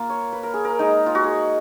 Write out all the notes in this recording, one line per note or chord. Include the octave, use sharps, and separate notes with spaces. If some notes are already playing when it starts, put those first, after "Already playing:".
Already playing: A#3 F4 F5
C#5
B4
A#4
G#4
A#4
G#3 D#4
F4
F#4
G#4